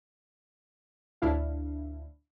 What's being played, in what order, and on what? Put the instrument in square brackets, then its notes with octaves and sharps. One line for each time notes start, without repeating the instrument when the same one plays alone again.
[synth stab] D2 A2 D4 E4 F5